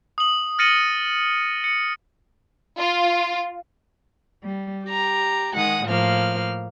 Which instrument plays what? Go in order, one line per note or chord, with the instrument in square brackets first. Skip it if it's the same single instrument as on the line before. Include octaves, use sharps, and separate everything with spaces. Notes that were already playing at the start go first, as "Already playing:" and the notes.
[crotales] D#6 F#7
F6 A6 A#6 C#7 D#7 F#7
C#7
[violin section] F4
[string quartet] G3
G4 A#5
D#3 G#3 F#5 D#6
A2 F3 A#3 F6